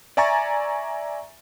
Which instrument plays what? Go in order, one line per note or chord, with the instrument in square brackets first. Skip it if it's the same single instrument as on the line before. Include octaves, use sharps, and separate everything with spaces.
[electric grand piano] D5 E5 G#5 A#5 C#6 A6